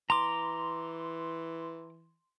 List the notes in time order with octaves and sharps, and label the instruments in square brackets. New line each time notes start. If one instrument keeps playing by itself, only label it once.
[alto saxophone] E3 [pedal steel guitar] A#5 D6 [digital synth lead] C6